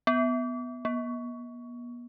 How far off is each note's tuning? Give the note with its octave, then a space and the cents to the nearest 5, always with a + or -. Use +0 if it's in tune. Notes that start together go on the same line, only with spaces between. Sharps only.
B3 +5
B3 -40